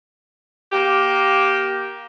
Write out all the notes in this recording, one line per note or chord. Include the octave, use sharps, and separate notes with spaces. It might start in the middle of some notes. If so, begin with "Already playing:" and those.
A#3 G4